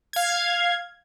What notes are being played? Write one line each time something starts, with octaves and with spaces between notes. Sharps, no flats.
F5 G#6